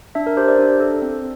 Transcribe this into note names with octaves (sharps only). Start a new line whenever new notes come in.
D4 E5
A#4
G4 C5
D5
D4
A4
C4